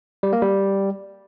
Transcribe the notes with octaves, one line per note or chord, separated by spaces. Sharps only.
G3
A#3
G3